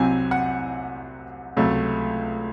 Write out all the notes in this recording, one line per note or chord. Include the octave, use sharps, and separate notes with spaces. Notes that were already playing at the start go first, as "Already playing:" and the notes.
Already playing: C2 C3 F#3 C4 G#5
F#5
C#2 C3 F#3 A3